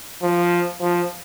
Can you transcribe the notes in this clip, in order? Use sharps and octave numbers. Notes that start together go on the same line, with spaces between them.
F3
F3